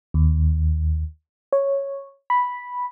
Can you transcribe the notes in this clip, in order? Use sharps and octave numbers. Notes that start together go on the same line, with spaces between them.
D#2
C#5
B5